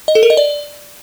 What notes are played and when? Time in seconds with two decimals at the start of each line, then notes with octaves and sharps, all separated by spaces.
0.08 D#5
0.15 A4
0.23 A#4
0.30 D#5
0.37 D5